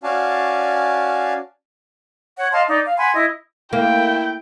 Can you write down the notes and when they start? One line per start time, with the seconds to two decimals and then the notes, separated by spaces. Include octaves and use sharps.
0.03 C#4 F#4 D5 F5 G#5 A5
2.37 C#5 F#5
2.52 D#5 F5 A5 C6
2.68 D#4 D5
2.85 F5
2.97 F#5 G#5 B5 C6
3.13 E4 D#5
3.73 A#3 E4 G5